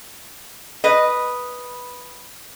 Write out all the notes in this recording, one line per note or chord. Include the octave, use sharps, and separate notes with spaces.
B4 D#5